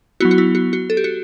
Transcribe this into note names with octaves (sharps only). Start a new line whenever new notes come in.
F#3 B3 E4 F#4
F#4
E4
F#4
F#4
A4
G4
F#4